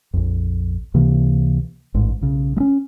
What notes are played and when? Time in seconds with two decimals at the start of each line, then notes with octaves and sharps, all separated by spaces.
0.14 A#1 F2
0.94 C#2 C3 E3 A#3
1.94 A1 G#2
2.21 B1 C#3
2.57 G#3 C#4